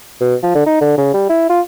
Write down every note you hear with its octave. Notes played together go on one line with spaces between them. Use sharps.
B2
F3
D3
D#4
D3
C#3
G3
E4
F4